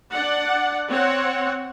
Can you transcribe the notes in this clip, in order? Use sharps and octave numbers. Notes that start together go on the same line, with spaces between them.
D4 D5 F#5
C4 C#5 F#5